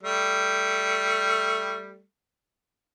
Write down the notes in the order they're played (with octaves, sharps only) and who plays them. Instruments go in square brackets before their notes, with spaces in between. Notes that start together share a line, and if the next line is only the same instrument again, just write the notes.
[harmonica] G3 A3